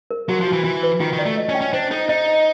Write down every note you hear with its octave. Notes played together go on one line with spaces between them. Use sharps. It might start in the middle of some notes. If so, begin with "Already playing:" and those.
A#4
F#3 F#4
F3
F#4
E3
E3 F4
B4
D#3 F4
D#3
D5
A3
D#5
C#4
G5
C#4
D4 C5
D#4 A4
D#4 D#5
D#5